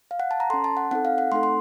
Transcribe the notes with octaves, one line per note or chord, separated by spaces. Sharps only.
F5
F#5
A5
A#5
C#4 A4 C6
A5
F#5
C4 D#4 A4 F#5
F5
F#5
A3 C4 D#4 A4 C6
C6